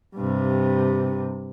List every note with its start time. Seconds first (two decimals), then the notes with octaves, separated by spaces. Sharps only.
0.16 G2 C3